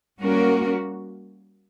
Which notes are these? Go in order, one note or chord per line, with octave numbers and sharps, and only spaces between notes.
G3 A#3 C#4 F#4 A#4